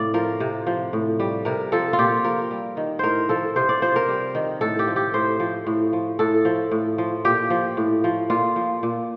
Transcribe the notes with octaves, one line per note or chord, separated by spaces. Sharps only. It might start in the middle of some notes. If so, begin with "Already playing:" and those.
Already playing: A2 C3 D5 F5
F3 A#4
C3
F3
A2
G3
C3 A#4
F3 A4
F4
A#2 G4
F3 A#4
G3
D#3
A2 A#4 C5
F3 A4
C3 C5
D5
F3 C5
A#4
G3
D#3
A2 A4
G4
F3
G4
A2 C5
F3
A2
F3
A2 A4
F3
A2
F3
A#2 G4
F3
A2
F3
A#2 F4
F3
A#2